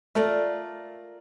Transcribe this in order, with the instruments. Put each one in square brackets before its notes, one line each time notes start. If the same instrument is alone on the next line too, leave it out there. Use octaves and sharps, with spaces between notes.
[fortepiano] A3 [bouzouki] F4 A#4 D5